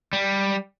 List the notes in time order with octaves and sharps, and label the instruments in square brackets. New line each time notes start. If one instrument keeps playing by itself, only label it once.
[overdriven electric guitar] G3